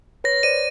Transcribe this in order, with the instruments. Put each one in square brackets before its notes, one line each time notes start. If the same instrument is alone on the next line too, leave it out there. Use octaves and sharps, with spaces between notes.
[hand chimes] B4 C#5 [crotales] A#6
[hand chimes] C5 D5 [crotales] D#7